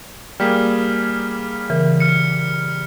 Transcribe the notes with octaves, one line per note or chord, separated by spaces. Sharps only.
G3 A#3 G#4 G5 F6 B6
C#3 E3 A#4
F6 C#7